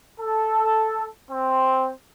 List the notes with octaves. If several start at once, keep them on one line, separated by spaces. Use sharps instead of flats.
A4
C4